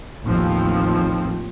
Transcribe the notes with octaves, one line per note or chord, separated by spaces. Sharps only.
A1 D#2 F3 C4